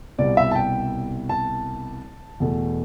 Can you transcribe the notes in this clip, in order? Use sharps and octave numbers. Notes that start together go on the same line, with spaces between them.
C2 B2 G3 D5
E5
A5
G5
A5
E2 B2 A3